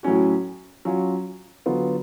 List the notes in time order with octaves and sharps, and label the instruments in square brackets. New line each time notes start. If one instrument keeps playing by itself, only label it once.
[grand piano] A2 F#3 C#4 F#4
F#3 C#4 F4
D3 F#3 B3 F4